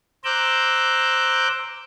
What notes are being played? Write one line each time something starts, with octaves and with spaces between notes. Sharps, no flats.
C5 A#5 D6 E6 F#6 G6